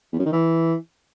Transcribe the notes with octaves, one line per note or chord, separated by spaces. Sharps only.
E2
F#2
D#3
E3